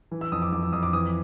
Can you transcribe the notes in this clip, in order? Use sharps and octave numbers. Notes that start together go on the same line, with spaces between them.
E3
E6
F2 D#6
D6
F2 D6
E6
F2 D#6
D6
E3 D#6